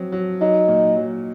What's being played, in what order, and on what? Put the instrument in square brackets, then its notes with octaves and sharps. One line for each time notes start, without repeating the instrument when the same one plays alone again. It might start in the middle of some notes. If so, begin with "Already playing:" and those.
Already playing: [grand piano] F3 F#3 C4
F#3
[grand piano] F#3 [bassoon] D#4
[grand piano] A#2
F#3